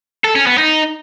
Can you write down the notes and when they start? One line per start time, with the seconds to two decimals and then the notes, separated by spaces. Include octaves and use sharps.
0.24 A4
0.36 C#4
0.47 B3
0.58 D#4